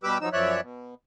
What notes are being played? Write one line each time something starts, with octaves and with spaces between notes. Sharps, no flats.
B2 G3 G4 B4 D6 E6
F3 F#3 D#4 E6
F#2 F3 C#5 D5 E5 F#6
B2